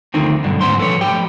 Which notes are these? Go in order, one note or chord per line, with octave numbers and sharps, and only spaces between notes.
D2 D3 D#3 F3 C4
B1 G2 D3
D2 G#2 B3 C#4 C5 C6
F3 A4 B4 C#5
F3 G4 G5